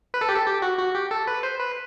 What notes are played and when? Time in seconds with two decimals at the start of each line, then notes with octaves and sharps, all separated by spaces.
0.14 B4
0.21 A4
0.29 G4
0.36 A4
0.47 G4
0.62 F#4
0.79 F#4
0.95 G4
1.11 A4
1.27 B4
1.43 C5
1.59 B4